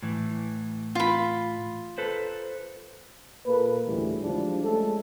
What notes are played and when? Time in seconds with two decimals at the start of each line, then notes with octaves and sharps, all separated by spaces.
0.03 A2 E3
0.95 F4 B5
1.98 A4 B4 C5
3.46 A#2 A#3 A4 B4
3.86 D2 A2 C#3 E3 G3
4.21 F3 G3 G#3 D4 E4
4.64 G#3 A3 C#4 A4